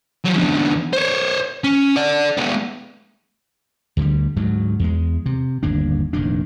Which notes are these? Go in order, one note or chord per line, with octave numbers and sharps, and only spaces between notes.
F3 F#3
E2 D3
C5 C#5
C#4
A4 D5
G#3 B3
D2 D3 F3 G3
D2 G#2 F#3
E2 G#3
C3
G1 D#2 A2 D4
F1 A#2 D#3 D4